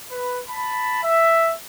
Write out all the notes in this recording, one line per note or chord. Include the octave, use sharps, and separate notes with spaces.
B4
A5 B5
E5